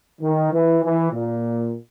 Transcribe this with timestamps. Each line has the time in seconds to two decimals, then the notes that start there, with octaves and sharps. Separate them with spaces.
0.21 D#3
0.51 E3
0.82 E3
1.11 A#2